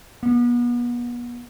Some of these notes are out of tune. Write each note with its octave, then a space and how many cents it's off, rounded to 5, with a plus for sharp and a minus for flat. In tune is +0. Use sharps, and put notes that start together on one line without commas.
B3 -35